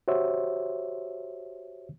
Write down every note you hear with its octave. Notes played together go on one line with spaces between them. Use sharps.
F#4 G4 C5 C#5 E5